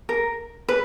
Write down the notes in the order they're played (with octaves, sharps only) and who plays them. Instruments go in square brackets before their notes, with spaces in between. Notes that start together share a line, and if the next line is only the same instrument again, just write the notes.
[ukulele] A#4
B4